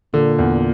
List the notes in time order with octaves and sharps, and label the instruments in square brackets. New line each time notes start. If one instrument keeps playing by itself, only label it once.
[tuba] A#2 [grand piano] D3
[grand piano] E2